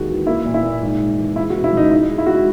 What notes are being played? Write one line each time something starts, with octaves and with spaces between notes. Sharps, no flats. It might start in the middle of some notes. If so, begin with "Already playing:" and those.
Already playing: D#2 G#3 F#4
E3
A#3 E4
A#2
E4
A#2
G#2
G#2
E3
G#3 E4
F#4
B2
E4
C#2 D#4
G#2 E4
G#3
E4
G#2 F#4
E4